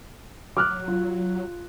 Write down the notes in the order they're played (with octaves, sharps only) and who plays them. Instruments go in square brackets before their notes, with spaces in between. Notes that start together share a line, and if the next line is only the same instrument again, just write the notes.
[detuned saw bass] F#3 [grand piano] D6 F6 F#6
[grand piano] F4